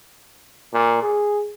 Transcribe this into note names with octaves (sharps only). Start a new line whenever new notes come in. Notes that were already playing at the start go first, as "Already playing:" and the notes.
A#2
G#4